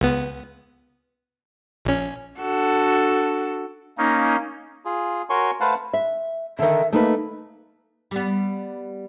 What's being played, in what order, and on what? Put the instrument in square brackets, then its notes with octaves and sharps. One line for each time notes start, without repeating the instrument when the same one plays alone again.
[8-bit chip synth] C#2 B3
A#1 C#4
[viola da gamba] D4 F#4 A4
[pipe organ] A#3 C#4 D#4
[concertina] F4 G#4
F#4 A#4 C#5 G#5 C6 C#6
A3 B4 C5 F5 F#5 A5
[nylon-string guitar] E5
[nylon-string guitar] D3 D#3 [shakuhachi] E5
[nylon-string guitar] A3 D#4 B4 [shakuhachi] A#3
[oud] G3 B3